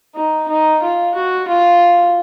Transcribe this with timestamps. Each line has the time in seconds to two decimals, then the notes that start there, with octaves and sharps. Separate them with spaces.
0.15 D#4
0.48 D#4
0.82 F4
1.15 F#4
1.48 F4